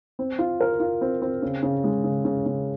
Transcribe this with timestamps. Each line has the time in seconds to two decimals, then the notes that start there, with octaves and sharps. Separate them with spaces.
0.19 C4
0.39 F4
0.60 A#4
0.80 F4
1.01 C4
1.22 C4
1.42 C#3
1.63 C#3
1.84 G#3
2.04 C#3
2.25 C#3
2.46 C#3